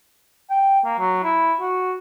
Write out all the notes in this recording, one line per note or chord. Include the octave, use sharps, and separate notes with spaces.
G5
A#3
F#3
E4
F#4